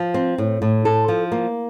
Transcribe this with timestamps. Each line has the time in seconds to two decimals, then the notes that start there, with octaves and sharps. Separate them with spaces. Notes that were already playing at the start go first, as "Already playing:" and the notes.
Already playing: F3
0.14 C4
0.38 A2
0.62 A2
0.85 A4
1.08 F3
1.32 A#3